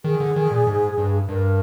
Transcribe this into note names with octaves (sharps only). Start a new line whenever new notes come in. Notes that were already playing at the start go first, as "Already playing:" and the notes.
D#3 G#4
D3
D#3
A#2
G#2
G2
G2 A#4